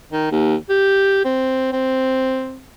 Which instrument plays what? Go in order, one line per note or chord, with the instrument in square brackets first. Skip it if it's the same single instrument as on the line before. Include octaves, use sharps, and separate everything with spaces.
[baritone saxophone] D#3
D#2
G4
C4
C4